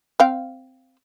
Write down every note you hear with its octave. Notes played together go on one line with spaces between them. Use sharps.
C4 F5 G5